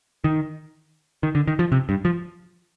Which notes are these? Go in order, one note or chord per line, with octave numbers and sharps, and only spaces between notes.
D#3
D#3
D3
D#3
F3
C3
G2
F3